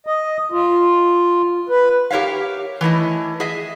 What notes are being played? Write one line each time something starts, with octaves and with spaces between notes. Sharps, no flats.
D#5
F4
B4
G4 A#4 C#5 E5 F5
E3 A3 E4 D#5
G#4 D#5 E5